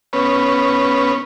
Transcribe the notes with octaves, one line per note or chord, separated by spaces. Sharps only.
B3 C#4